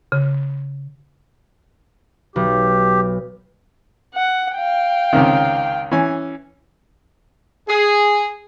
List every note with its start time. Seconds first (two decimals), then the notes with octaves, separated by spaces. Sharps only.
0.12 C#3
2.36 B1 G4
4.14 F#5
4.56 F5 G5
5.13 C#2 C3 D#3
5.91 E3 C#4 G#5
7.68 G#4